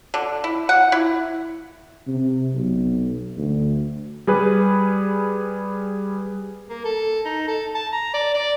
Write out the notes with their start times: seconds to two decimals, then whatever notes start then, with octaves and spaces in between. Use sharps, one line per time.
0.14 D3
0.44 E4
0.69 F#5
0.92 E4
2.07 C3
2.54 B1
3.37 D2
4.27 G3 G#4 B4
6.70 A#3
6.85 A4
7.25 D#4
7.48 A4
7.75 A5
7.92 A#5
8.14 D5
8.34 D5